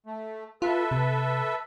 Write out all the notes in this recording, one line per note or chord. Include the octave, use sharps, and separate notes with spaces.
A3
F4 A4 B4 E5
C3